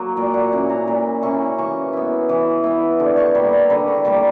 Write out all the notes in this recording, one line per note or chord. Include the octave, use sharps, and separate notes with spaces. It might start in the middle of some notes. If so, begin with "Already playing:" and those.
Already playing: F#3 A#3
A#2 D5
F#5
A#3 C#4 E4 F#5
A#5
A#2 B5
A#3 C#4 E4 C#6
E3 C#6
B3 E4
E3
B3 E4
D3 D6
C#6
G3 A#3 B5
A#5
D3 B5
C#6
G3 A#3 D6